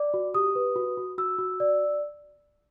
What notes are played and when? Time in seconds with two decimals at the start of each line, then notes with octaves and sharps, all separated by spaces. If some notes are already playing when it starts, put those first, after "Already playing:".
Already playing: D5 D6
0.14 F#4
0.34 G4 D#6
0.55 B4
0.76 F#4
0.97 F#4
1.18 F#4 E6
1.38 F#4
1.60 D5